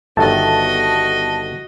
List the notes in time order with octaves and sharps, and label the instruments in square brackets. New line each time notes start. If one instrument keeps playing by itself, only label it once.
[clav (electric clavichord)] G1 D#3 A3 [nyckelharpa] F#4 D#5 [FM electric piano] A5